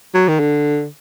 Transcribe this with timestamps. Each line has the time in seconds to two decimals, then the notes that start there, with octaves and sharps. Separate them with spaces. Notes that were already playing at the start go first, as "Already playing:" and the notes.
0.14 F#3
0.28 D#3
0.40 D3